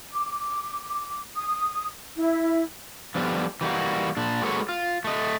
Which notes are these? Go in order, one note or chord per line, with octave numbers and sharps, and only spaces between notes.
D6
D#6
E4
D3 F3 G3 B3 D4
E3 G3 A#3 F#4
A#2 D4
G#3 A#3 F#4 A4 B4 C#5
F4
A3 D#5